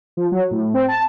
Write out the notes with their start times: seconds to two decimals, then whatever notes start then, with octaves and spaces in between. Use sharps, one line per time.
0.17 F3
0.32 F#3
0.51 A2
0.74 C4
0.88 A5